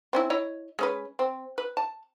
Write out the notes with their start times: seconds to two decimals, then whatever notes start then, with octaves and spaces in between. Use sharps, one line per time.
0.13 C4 C#4 E4
0.30 E4 C#5 D#5
0.79 G#3 C#4 B4
1.19 C4
1.58 B4
1.77 A5